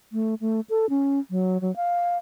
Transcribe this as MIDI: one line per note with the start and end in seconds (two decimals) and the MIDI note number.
0.13 0.35 57
0.41 0.60 57
0.70 0.89 69
0.89 1.19 61
1.31 1.60 54
1.61 1.74 54
1.76 2.17 77